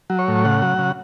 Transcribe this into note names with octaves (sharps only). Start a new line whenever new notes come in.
F#3
C#5
A2
C#3 F#5
F#3
C#3